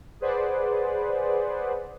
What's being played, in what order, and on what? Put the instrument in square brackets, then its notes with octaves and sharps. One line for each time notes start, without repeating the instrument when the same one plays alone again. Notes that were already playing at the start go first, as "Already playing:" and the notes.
[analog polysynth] G#4 B4 C5 D5 F#5